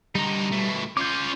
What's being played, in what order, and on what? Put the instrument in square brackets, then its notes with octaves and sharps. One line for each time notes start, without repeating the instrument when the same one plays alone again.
[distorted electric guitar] D3 D#4 [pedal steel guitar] G3 A#5
[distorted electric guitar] B2 A3
[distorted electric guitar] C#4 F4 [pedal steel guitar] D6 G6